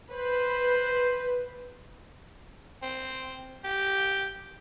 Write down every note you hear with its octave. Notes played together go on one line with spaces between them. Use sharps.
B4 C5
C4
G4